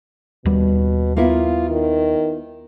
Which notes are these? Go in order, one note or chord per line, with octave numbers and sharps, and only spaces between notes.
D#2 B2 G3
A#3 B3 E4 F4
D#3